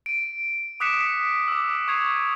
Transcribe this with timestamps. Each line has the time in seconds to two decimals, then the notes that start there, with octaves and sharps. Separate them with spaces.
0.06 D7 D#7
0.80 D6 D#6 F#6 B6 C#7 E7
1.48 D6 E6
1.88 C#6 D#6 G#6 C7 F7